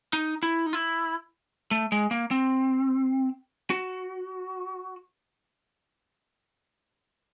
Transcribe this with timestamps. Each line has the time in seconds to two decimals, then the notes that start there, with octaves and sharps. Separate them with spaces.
0.13 D#4
0.43 E4
0.66 D#4
0.73 E4
1.71 A3
1.92 G#3
2.11 A#3
2.31 C4
3.70 F#4